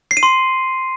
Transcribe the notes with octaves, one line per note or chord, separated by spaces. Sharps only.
C7
D#7
C6